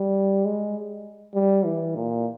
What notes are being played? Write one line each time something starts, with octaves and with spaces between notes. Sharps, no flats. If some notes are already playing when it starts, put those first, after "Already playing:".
Already playing: G3
G#3
G3
E3
A#2